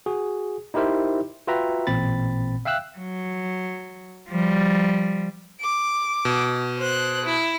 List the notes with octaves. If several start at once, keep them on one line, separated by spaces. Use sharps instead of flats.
F#4 G#4
D#4 E4 G4 A#4 C5 E5
F4 F#4 B4 E5 G5 A#5
A1 A#2 C4 B5 A6
E5 F5 G5 E6 F#6
F#3
F3 G3
D6
B2
C5 F#6
E4